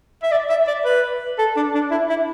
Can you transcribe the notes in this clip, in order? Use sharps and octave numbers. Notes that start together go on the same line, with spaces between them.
E5
D5
E5
D5
B4
A4
D4
D4
E4
E4